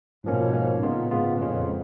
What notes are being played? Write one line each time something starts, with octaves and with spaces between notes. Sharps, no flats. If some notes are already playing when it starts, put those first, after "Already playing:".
G#2 B2 F3 A#3 C#4
G#2 F3 A#3 C#4
A#2 C#3 G#3 B3 F4
G#2 C#3 G#3 B3 F4
F2 A#2 G#3 C#4 F4